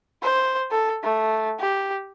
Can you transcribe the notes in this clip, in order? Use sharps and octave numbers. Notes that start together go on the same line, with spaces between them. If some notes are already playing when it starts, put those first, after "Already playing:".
C5
A4
A3
G4